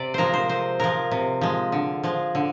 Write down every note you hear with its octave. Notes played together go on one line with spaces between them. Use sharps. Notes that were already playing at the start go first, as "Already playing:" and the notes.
Already playing: C3 D5
F3 G#3 A#4 C5
C5
C3 C5
F3 G#3 A#4
C3
F3 G#3
D3
F3 G#3
D3